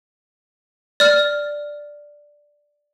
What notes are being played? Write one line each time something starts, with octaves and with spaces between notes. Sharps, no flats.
D5 F6